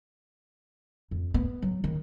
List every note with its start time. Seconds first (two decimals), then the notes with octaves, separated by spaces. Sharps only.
1.11 F2
1.34 B3
1.62 F#3
1.84 D#3